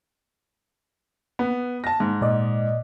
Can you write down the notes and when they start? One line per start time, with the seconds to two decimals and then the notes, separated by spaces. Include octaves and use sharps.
1.39 B3
1.84 A5 A#6
2.00 G#2
2.21 A#2 D5 D#5